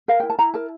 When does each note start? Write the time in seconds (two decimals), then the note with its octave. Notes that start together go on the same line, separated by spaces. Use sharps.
0.08 A#4 F5
0.20 E4 G5
0.30 A5
0.39 E4 A#5
0.54 A#4 A5